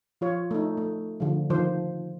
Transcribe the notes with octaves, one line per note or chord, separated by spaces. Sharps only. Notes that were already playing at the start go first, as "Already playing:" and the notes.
F3 F4 C#5
A3 D#4
A3
D3 F3
D#3 F3 C5